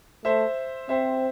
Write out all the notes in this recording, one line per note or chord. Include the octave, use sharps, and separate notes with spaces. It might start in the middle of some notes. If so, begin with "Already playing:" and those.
A3 C5 E5
C4 C5 E5